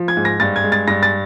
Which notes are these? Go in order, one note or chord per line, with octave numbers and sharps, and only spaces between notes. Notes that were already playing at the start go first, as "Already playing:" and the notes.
Already playing: F3
G#6
G#2
A#6
G2 A6
G#6
G#3
A6
G2 A#6
A6